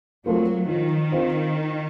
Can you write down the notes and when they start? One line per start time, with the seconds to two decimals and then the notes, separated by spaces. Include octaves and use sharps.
0.26 F#3 A3 C4 F4 A#4
0.68 D#3 F3
1.12 C4 F4 C5